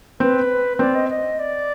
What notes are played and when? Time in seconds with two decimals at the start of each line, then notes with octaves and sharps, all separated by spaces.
0.20 C4 B4
0.79 C4 D5
0.94 D#5
1.09 D#5
1.39 D5